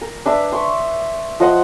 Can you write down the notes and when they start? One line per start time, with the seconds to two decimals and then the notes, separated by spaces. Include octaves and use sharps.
0.02 A#4
0.26 D4 B4 E5
0.52 C6 C#6
1.40 F3 D#5 F#5 C6